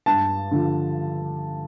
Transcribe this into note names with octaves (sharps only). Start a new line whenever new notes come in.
G2 A5
D3 F3